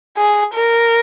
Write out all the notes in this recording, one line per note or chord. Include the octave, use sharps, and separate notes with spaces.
G#4
A#4